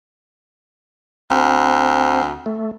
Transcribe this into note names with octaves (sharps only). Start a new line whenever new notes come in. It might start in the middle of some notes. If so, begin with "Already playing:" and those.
D2 C4
A3